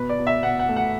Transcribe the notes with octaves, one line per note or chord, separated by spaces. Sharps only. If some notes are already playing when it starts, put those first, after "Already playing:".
Already playing: B2 B4
D5
B2
E5
B2 F#5
F#5
A3
F#5